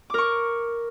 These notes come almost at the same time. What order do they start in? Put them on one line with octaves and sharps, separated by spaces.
D6 A#4 C#6